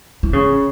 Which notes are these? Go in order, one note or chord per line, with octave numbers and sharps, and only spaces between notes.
E3
C#3